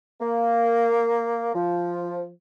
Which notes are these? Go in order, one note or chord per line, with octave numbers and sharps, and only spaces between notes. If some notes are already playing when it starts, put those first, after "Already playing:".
A#3
F3